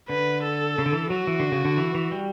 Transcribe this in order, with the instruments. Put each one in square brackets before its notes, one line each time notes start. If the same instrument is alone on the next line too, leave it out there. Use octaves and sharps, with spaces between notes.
[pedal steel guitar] D3 [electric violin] B4
[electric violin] A4
[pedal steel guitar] C#3
D3
E3
[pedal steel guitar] F#3 [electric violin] F#4
[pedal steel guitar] E3
D3
C#3
D3
E3
E3
G3